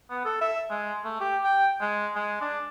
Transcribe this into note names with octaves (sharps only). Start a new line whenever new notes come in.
B3
A4
E5
G#3
A3
G4
G5
G#3
G#3
D4